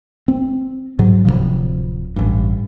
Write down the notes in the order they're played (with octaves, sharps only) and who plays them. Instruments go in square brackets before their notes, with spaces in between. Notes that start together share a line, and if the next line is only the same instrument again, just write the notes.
[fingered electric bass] C4
G#2 F#3
D1 B1 C3 F3
A1 G2